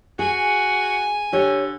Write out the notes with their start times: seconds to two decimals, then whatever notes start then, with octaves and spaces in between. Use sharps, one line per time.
0.19 F#4 G#4 G#5
1.33 D3 G4 C#5